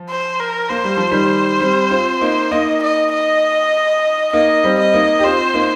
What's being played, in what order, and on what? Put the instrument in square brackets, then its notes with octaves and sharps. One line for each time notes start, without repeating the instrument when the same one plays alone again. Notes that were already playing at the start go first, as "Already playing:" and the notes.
Already playing: [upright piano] F3
[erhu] C5
A#4
[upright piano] A#3 [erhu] C5
[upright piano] G3
F3
D#3 G3
G3 C4
C4 F4
A#3 D#4
[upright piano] A#3 D#4 [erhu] D#5
[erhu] D#5
D#5
[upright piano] A#3 D#4 [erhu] D#5
[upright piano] G3 C4
[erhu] D#5
[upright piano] A#3 D#4
G4
[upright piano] C4 F4 [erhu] C5
[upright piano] A#3 D#4